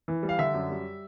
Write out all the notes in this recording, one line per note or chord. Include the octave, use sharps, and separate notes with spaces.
E3
G3
F5
D3 E5
F#2
G3